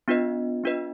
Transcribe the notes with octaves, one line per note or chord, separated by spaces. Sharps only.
B3 D4 F4 B4 D#5
B3 D4 F4 B4 D#5